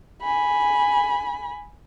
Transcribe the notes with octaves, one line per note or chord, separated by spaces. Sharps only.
G#5 B5